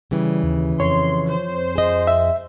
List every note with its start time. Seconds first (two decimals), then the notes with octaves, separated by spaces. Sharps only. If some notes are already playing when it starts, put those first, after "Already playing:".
0.11 C#3 E3 G3
0.43 D#2
0.80 F2 C#5 C6
1.29 C5
1.75 G#4 D#5
2.07 E5